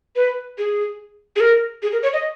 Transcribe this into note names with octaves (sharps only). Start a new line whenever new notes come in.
B4
G#4
G#4
A#4
G#4
A#4
C#5
D#5